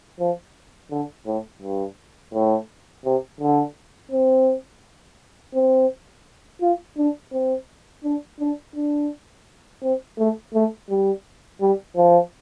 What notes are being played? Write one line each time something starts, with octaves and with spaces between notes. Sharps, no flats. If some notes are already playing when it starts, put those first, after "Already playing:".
F3
D3
A2
G2
A2
C3
D3
C4
C4
F4
D4
C4
D4
D4
D4
C4
A3
A3
G3
G3
F3